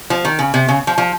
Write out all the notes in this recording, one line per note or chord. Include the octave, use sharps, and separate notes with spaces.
F3
D#3
C#3
C3
C#3
F3
F3